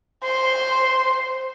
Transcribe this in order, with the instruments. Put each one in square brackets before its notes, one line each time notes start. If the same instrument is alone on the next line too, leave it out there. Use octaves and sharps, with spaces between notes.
[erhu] C5 [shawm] C6